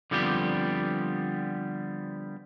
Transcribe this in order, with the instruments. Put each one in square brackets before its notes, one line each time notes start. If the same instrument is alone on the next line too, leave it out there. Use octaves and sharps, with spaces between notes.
[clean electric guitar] D3 F3 G3 B3 C4 G4